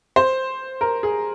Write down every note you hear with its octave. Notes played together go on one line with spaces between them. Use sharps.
C5
A#4
G#4